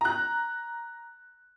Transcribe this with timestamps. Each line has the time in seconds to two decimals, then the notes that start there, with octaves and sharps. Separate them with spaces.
0.01 A#5 F#6